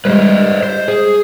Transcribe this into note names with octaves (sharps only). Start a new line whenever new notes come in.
G3 G#3 B4 C5 D#5
C5
G#4